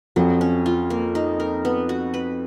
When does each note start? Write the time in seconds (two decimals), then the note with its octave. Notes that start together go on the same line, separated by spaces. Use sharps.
0.16 F2 F3 F#3
0.41 C#4
0.66 F4
0.90 A#3
1.15 D#4
1.40 A#4
1.65 B3
1.89 F#4
2.14 B4